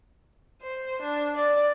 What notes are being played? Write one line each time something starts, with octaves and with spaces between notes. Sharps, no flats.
C5
D4
D5